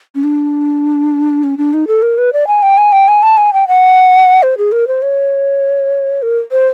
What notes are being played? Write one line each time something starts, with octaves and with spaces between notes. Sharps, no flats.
C#4
D4
C#4
D4
D#4
A4
A#4
B4
D5
G#5
G5
G#5
G5
G#5
A5
G#5
G5
F#5
C5
G#4
A#4
C5
C#5
A#4
C5